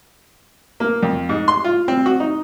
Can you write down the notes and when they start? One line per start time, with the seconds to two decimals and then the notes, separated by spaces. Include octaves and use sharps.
0.80 A#3
1.03 F2
1.29 G#2
1.48 C6
1.64 F4
1.88 C4
2.06 F#4
2.20 D#4